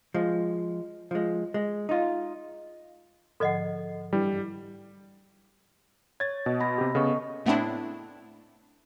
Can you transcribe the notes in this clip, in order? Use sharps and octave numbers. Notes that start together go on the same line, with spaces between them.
F3 G#3
F3 G#3
G#3
D#4 F4
G#2 D3 F3 A4 D#5 F#5
G2 E3 G3
C#5 G#6 A6
B2 D#5
B3 B5 A#6
C3 G4
C#3 B3 A4 D#5 C#6
A2 A3 B3 C4 D4 E4